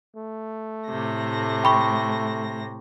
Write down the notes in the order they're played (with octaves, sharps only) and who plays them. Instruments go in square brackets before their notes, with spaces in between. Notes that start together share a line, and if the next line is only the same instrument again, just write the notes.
[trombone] A3
[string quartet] A2 C3 A#6
[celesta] G5 B5 C#6